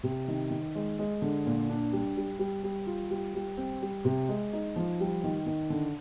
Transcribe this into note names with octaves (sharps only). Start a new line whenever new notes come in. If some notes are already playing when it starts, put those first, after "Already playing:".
C3
D#3
D#3
G#3
G#3
D3
A#2
D4
G3
G3
G3
G3
F4
G3
G3
C4
G3
C3
G#3
D#4
F3
G3
D#3
D#3
D3